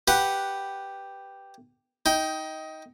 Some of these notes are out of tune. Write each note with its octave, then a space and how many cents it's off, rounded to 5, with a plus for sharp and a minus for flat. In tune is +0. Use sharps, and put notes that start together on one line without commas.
G4 +0 B4 +0 F#5 +0
D#4 +20 G5 -10